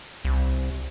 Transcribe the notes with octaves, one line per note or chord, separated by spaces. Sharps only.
C2